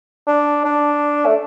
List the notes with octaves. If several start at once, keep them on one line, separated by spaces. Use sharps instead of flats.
D4
D4
A3